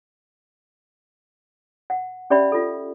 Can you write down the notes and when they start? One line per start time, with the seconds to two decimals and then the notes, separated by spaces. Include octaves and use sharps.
1.90 F#5
2.30 C#4 G4 D5 E5 B5
2.52 F4 A4